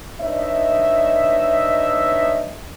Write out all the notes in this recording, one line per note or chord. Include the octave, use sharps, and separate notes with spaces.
D4 D#4 B4 C#5 D#5 E5